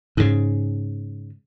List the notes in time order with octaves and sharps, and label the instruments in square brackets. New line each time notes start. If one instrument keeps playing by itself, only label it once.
[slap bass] G#2 C#3